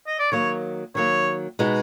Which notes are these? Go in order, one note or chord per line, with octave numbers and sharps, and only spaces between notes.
D#5
D5
D#3 F#3 A#3 C#5
D#3 F#3 A#3 C#5
B2 G#3 B3 D#4 F#4